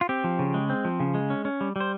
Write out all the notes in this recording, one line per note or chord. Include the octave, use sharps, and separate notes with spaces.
F4
C4 G4
F3
C#3
G#3
C4
F3
C#3
G#3
C#4
C#4
G3
G3 C5